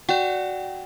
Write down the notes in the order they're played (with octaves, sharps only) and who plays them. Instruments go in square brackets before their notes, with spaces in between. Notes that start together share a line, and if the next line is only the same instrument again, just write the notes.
[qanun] F#4 [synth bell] D5 G5